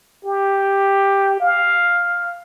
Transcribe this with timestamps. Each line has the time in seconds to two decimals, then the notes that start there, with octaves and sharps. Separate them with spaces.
0.25 G4
1.40 F5